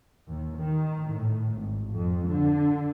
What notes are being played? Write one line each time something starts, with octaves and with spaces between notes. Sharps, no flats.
D#2
D#3
A2
G#1
F2
D3